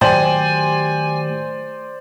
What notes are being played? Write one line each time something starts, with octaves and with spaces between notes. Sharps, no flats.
A2 D#3 F#3 G4 C5 D5 G#5